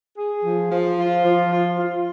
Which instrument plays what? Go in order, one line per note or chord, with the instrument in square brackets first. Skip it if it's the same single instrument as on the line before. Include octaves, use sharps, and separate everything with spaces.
[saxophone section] G#4
F3
F3
F4
F3
F4
F4